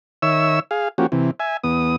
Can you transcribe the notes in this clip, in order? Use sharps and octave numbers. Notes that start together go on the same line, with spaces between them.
D#3 C#5 E5 E6
G#4 F5
F3 A#3 C#4 F#4 G4
C3 E3
E5 G#5
E2 B3 D#6